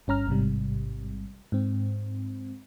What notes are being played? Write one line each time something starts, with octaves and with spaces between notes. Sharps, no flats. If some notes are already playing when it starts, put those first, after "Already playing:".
G1 G2 C#4 A#5 F6
A1 G#2 C3 G3
G#2 C4